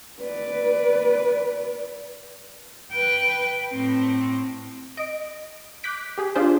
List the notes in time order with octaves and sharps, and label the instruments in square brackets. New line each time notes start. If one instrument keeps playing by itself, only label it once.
[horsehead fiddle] B4 D5
[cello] B4 G5
A2 C4
[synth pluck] D#5 D7
D6 F#6 G6 B6 D7
G4 G#4
D4 F4 G#4 C5